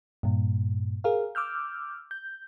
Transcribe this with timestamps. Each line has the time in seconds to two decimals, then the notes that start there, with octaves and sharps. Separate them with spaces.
0.23 G2 A#2
1.04 G#4 A#4 F5
1.35 D6 E6 F6 G6
2.11 G6